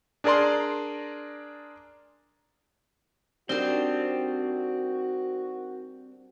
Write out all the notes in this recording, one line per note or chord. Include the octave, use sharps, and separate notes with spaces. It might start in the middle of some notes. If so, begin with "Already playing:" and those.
D4 G#4 A#4 D5 A#5 C6
G3 C4 D4 D#4 F#4 A#4